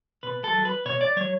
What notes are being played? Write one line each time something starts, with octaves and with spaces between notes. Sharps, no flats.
B2 B4
A4
F#3
B4
B2 C#5
D5
F#3 C#5